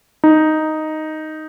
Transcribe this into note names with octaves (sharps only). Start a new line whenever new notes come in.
D#4